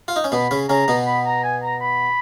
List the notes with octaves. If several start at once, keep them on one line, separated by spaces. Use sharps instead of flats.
F4
D#4
C#4
B2 B3 B5
C#3 C#4
C#3 C#4 A#5
B2 B3
B5
A#5
G#5
A#5
B5